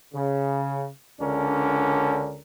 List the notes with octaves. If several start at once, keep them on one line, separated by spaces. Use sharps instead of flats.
C#3
C#2 D3 C#4 D4 A#4